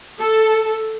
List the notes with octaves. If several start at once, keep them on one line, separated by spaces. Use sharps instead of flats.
A4